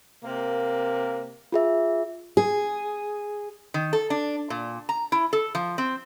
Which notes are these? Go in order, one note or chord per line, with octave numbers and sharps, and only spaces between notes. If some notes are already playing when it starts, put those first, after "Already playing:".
C3 A#3
F4 G#4 E5
G#4
D#3
A4
D4
A#2
A#5
E4
A4
F3
C4